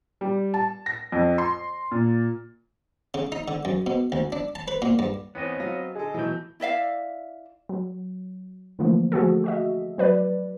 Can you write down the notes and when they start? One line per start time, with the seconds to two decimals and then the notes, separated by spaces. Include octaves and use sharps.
0.21 G3
0.54 A5
0.86 A#6
1.12 F2
1.38 C6
1.91 A#2
3.14 C#3
3.32 D#4
3.48 D3
3.65 F#2
3.86 B2
4.12 D2
4.32 D4
4.55 A5
4.68 B4
4.82 A#2
4.99 G2
5.35 E2 B3 C4 C#5 D#5
5.60 F#3 F5 A#6
5.95 D3 G#4 A4 D#5
6.14 B2 E3 F#3 A3 G6
6.60 E4 D5 E5 F5
7.69 F#3
8.79 D3 E3 F3 A3 A#3
9.12 F3 A3 F#4 G#4 A4
9.44 F#4 D#5 E5
9.98 F#3 B4 D5